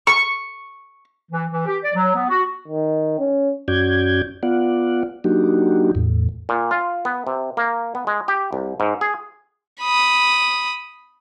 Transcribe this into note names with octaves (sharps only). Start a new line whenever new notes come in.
C#6
E3
E3
G4
D5
F#3
B3
F#4
D#3
C#4
F#2 C#4 F#4 D5 G6 G#6
B3 F4 D5 F#5
F#3 A#3 D4 D#4 F#4 G4
E2 A2
A#2
F4
B3
C3
A#3
B3
G#3
G4
C2
G#2
G#4
B5 D#6